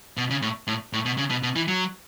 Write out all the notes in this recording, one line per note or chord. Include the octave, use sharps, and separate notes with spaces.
B2
C#3
A2
A2
A2
B2
C#3
B2
B2
E3
F#3